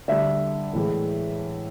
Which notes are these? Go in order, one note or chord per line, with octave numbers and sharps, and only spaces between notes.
D3 G3 E5
A2 E3 G#3